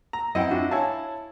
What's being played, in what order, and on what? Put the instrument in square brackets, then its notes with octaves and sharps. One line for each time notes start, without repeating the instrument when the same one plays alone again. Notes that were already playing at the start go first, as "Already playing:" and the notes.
[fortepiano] A#5
[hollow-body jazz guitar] F#2 F#5 G5 [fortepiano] C4 E4 D#5
[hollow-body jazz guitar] D4 F4 F#4
[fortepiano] E4 G#5 A5 [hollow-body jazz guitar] C#5 F5